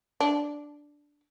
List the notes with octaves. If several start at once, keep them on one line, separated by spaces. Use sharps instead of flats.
D4